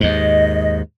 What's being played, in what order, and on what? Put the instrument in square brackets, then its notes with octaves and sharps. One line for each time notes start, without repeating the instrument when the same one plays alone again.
[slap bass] D#2 G#2 [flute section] D#5